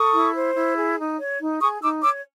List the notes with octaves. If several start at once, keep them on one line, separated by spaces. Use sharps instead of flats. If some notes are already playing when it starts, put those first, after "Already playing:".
Already playing: A4 C#6 D#6
E4
C5
E4
G#4
D#4
C#5
D#4
G#4 C#6 D#6
D#4 D6 E6
C#5 D6 E6